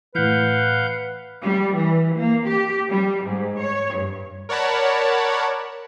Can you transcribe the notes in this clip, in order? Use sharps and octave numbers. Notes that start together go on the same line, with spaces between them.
A2 E3 B4 F5 F#5 G6
G3
E3
A#3
G4
G3
G#2
C#5
G2
A#4 C#5 D5 F#5 A5 B5